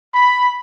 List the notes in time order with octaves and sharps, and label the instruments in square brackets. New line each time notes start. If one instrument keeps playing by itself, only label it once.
[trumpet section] B5